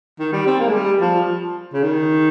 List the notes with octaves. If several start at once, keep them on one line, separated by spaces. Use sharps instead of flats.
D#3
G3
C4
A#3
G#3
G3
F3
C#3
D#3